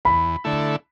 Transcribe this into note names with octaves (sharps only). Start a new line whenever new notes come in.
E2 B5
D3 A3 E4